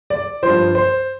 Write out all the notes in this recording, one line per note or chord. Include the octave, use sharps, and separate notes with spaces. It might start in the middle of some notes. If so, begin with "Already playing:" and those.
D5
G2 F3 C5
C5